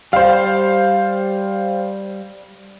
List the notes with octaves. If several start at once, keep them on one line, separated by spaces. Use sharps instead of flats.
G3 C5 F5